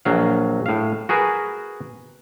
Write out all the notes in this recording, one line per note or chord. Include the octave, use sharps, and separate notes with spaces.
A#1 F#3 F5
A2 F5
F#4 G#4 A#4 B4